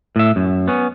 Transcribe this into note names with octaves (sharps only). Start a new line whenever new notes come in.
A2 E5
F#2
B3 C#4